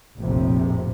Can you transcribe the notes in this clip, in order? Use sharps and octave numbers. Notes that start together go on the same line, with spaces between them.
F1 A#1 F2 A2 C3